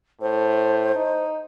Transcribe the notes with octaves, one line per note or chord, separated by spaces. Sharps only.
A2 C5
D#4